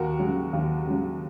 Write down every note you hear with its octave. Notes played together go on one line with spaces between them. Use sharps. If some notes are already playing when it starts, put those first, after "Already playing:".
Already playing: D#2 F#4 A#4
C#3 F#3
D#2
C#3 F#3